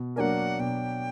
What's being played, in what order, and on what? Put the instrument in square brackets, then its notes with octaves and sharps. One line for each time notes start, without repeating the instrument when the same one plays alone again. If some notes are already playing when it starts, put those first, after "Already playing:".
Already playing: [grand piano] B2
[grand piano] F#3 A#3 D4 A#4 [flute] F#5 G#5
[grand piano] B2 [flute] G5